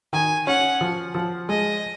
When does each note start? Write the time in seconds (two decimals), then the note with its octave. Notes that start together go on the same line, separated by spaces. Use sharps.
0.13 D#3 G#5
0.47 C#4 F#5
0.81 F3
1.15 F3
1.49 G#3 D#5